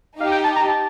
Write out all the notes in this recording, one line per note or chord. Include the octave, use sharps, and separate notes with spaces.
D#4 G4 F5
G5
A5
A#5
A5